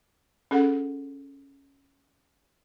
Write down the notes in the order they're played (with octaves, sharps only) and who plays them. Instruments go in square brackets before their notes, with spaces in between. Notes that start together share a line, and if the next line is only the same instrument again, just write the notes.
[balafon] C#4 G#4 A4 F#5